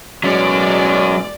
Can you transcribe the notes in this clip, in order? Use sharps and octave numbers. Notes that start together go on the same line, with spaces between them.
A1 B2 F#3 G#3 C#4 D5